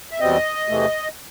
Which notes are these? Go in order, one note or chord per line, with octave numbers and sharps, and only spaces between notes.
E5
E2 B2 G3 C4 D#5
E2 C3 E3 A3